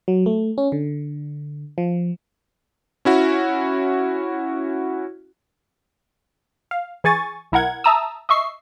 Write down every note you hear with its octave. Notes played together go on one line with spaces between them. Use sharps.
F#3
A3
C#4
D3
F3
C#4 E4 F#4
F5
E3 G#4 G#5 C#6 A6
B1 E4 A#4 F#5 G#6
E5 A5 A#5 D#6 E6
D#5 E5 C#6 C7